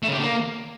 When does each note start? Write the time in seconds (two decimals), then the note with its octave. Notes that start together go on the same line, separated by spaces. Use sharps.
0.03 A3
0.08 C#3
0.13 G4
0.18 D3
0.23 A#3